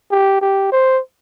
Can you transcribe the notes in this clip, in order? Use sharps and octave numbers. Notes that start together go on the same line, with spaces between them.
G4
G4
C5